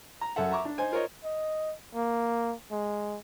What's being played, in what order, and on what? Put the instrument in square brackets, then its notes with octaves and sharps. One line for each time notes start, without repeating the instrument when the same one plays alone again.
[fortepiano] A#5
F#2 A4 E5 F#5
E5 A#5 C#6 D6
D4
D#4 C5 G#5
F4 A#4 C5 C#5 D#5
[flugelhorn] D#5
A#3
G#3